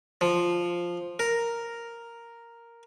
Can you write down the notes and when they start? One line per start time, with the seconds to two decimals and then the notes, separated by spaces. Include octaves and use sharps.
0.21 F3
1.19 A#4